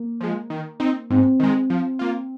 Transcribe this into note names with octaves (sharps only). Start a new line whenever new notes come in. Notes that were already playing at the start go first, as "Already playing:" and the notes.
Already playing: A#3
F3 G#3
D#3
C4 D#4
G#2 C4
D#3 G#3
F3
A#3 F4